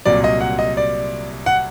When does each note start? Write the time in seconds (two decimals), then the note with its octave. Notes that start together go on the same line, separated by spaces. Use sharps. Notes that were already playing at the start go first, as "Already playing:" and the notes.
0.05 C2 A#2 F#3 D5
0.24 D#5
0.41 F#5
0.59 D#5
0.77 D5
1.46 F#5